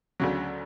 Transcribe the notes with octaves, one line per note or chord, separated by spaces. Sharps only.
D2 C#3 F#3